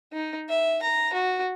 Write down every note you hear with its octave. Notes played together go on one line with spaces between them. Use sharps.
D#4
E5
A#5
F#4